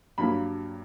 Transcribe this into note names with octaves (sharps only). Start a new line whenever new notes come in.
G2 F#3 A#3 B5